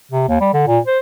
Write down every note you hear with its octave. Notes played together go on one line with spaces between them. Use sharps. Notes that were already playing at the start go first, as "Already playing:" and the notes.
C3
D#2
G3
D3
A#2
C5